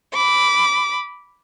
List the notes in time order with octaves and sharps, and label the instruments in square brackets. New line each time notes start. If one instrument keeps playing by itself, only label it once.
[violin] B5 D6